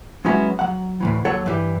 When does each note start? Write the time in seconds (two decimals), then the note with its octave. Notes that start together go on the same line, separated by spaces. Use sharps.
0.25 F#3 G#3 B3 C#4 E4 F#4
0.59 F#3 F#5
1.00 D2 A2 E3
1.25 D#2 F#3 A4 C#5 F#5
1.46 G2 E3 G4